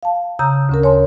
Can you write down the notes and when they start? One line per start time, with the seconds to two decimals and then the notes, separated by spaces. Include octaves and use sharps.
0.03 F5 A5
0.39 C#3 A#5 D#6 E6 G6
0.69 D2 C#4 A#4
0.84 C#5 G#5 A5 C6